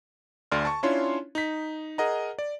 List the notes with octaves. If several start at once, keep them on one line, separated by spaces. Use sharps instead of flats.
D2 D3 D5 C6 F6
A5 C#6
C#4 D4 E4 F4 C#5 C6
D#4 B6
G#4 A#4 D#5 F#5 A#5
D5